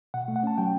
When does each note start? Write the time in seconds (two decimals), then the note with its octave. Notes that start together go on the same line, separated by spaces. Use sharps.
0.14 B2 F#5
0.28 A3
0.36 F#5
0.43 C#4 A5
0.58 F#3 G5